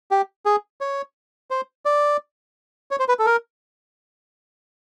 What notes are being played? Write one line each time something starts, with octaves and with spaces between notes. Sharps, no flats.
G4
G#4
C#5
C5
D5
C#5
C5
B4
A4
A#4